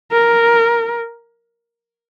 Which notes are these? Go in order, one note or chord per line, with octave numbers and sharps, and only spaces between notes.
A#4